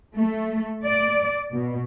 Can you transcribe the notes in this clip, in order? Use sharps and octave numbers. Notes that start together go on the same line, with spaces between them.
A3
D5
B2